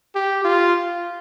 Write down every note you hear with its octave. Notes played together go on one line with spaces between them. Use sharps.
G4
F4